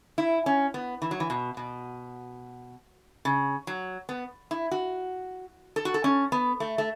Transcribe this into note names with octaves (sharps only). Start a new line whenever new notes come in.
E4
C#4
B3
E3
F#3
E3
B2
B2
C#3
F#3
B3
E4
F#4
A4
F#4
A4
C#4
B3
A3
A3